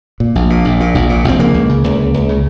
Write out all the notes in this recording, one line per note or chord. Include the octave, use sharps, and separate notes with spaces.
A#2
A#1
A#2
A#1
A#2
A#1
A#2
A#1 C4
C#3 A#3
C#2
C#3
C#2
C#3
C#2
C#3